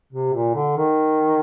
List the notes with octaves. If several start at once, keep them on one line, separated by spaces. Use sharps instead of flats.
C3
A#2
D3
D#3